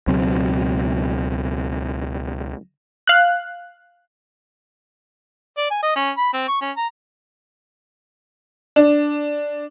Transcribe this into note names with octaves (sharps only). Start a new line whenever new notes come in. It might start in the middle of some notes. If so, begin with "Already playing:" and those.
C#2 B2 F#3 C4
F5 F#6
D5
G#5
D#5
C#4
B5
C4
C#6
C#4
A#5
D4